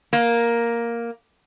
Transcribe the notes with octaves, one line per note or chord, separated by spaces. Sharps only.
A#3